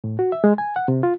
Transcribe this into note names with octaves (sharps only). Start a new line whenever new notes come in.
A2
F#4
E5
G#3
G#5
F#5
C3
F4